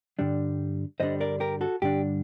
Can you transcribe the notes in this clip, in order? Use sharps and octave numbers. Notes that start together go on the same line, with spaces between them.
G2 D3 G3 D4
G2 D3 G3 D4 C5 D#5
A#4 D5
G4 A#4
F#4 A4
G2 D3 G3 D4 G4